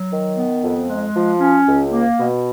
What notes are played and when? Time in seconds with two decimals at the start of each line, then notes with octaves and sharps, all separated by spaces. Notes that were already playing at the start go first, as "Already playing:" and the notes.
Already playing: F#3
0.11 D#3
0.36 B3
0.62 F2
0.88 G#3
1.14 F3
1.40 C#4
1.67 C#2
1.92 A#3
2.19 B2